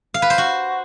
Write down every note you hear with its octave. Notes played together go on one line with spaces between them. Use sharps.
F5
B4
C5
F#4